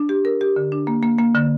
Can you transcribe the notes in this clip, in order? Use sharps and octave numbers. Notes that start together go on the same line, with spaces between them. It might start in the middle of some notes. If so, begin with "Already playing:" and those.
Already playing: D4
G4
A#4
G4
D3
D4
A#3
A#3
A#3
D3